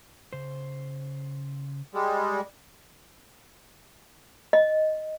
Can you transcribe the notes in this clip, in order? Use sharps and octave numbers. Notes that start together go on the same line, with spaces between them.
C#3 C5
G3 G#3
D#5